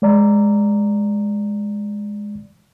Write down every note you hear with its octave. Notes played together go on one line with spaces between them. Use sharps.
G#3 D5 A#5